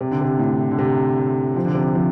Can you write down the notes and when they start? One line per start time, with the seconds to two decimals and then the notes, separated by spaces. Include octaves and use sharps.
0.01 C3
0.11 D3
0.21 C3
0.39 A2
0.71 D3
0.78 C3
1.56 F3
1.65 D3
1.74 C3
1.83 D3
1.95 F3